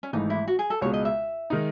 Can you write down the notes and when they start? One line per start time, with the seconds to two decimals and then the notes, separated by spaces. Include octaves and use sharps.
0.03 C#4
0.13 G#1 G#2 E3 A3 D#4
0.30 E4
0.48 F#4
0.59 G#4
0.70 A4
0.81 C#2 B2 G#3 C#5
0.93 D#5
1.05 E5
1.50 D#3 G#3 D#4